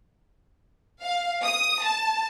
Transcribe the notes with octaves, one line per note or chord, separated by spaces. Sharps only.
F5
D#6
A5